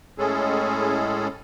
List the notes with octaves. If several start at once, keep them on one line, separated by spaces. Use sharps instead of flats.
A2 G#3 C#4 G#4 A4